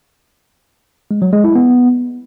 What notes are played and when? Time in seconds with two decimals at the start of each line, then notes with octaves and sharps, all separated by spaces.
1.11 G#3
1.22 F#3
1.33 G#3
1.44 E4
1.55 B3